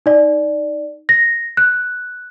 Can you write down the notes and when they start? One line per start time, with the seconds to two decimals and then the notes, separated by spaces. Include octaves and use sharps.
0.06 D#4 D5
1.09 A#6
1.57 F#6